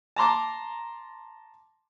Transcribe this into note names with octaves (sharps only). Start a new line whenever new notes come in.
A5 A#5 C6 D6